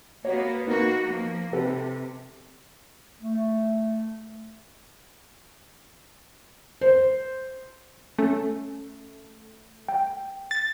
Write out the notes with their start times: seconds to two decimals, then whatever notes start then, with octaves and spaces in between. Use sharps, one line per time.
0.25 A#3 B3 F#4 C#5
0.67 A#3 B3 D#4 F#4 A#4
1.06 F3 A#3
1.53 C3 G4 A4 B4
3.22 A3
6.81 C5
8.19 A3 C#4
9.88 G5
10.51 A6